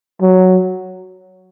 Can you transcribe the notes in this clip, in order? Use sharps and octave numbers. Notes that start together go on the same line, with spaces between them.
F#3